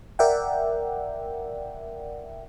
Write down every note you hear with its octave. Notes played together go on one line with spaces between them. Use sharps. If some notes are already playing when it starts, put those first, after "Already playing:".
A#4 D5 E5 F#5 G5